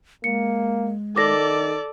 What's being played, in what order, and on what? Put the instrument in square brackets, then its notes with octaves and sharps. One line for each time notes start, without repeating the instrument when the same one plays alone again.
[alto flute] G#3 [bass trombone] A#3 [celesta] C#7
[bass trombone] D#3 [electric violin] A4 D5 [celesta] D6 A#6